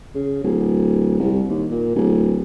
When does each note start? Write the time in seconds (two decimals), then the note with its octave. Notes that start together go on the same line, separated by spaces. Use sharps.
0.15 C#3
0.44 D1
1.20 C2
1.50 D#2
1.71 A#2
1.96 D1